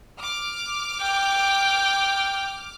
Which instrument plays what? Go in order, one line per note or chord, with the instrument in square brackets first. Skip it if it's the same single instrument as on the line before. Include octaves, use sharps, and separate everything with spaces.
[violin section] D6 F6
[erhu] G5